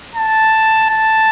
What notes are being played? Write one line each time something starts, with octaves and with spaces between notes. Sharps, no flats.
A5
A5